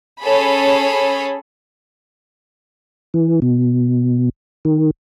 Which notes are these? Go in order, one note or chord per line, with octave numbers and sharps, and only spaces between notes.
C#4 G#4 A4 C#5 B5
E3
B2
D#3